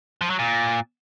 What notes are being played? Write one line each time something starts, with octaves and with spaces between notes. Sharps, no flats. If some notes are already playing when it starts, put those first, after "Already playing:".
F3
F#3
A#2